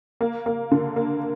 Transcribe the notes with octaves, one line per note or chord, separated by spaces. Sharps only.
A#3
A#3
D3
A#3